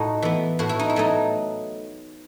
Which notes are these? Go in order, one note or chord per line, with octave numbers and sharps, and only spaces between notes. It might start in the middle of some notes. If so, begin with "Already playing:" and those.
Already playing: A2 D#4 F#4
E3 B3
A2 F#4
E4
D#4
E4
F#3 A3 D#4